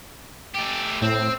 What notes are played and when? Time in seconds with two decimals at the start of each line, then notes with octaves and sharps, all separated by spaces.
0.55 A3 G4
1.02 A2 C4